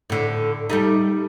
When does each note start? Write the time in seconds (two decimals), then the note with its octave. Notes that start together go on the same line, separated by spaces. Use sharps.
0.10 A2 D3
0.70 G3 A3 D#4